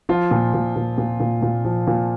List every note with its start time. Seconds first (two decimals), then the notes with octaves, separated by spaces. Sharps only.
0.09 F3 F4
0.31 A#2
0.54 A#2
0.76 A#2
0.98 A#2
1.20 A#2
1.42 A#2
1.65 F3
1.87 A#2